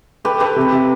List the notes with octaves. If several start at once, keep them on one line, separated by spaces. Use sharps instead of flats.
G4 A4 B4
G4 A4 B4
C3
C3